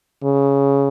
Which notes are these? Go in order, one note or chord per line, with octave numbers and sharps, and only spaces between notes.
C#3